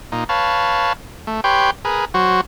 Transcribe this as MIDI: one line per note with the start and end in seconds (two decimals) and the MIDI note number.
0.12 0.24 46
0.12 0.24 63
0.29 0.93 71
0.29 0.93 73
0.29 0.93 77
0.29 0.93 81
1.27 1.41 57
1.44 1.71 67
1.44 1.71 71
1.44 1.71 73
1.44 1.71 79
1.44 1.71 84
1.85 2.05 68
1.85 2.05 70
1.85 2.05 71
2.14 2.41 54
2.14 2.41 66
2.14 2.41 72